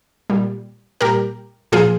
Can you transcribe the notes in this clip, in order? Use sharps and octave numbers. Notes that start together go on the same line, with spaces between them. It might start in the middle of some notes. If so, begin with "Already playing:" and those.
A#2 G3
A#2 G3 G4 A#4
A#2 F3 F4 G#4